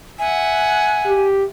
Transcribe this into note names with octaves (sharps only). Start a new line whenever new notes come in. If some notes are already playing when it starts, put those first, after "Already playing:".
E5 F#5 G#5
G4